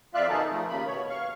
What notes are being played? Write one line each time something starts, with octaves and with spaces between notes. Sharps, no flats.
F2 F4 D5 E5 F5 F#6
B2 D#3 D#4 G#4 A4
F3 A3
D#2 C#3 A#3 B5
B2 C#5
F5 C#6